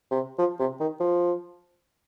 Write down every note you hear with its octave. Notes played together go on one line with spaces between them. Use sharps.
C3
F3
C3
D#3
F3